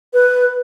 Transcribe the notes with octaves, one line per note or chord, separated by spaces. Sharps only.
B4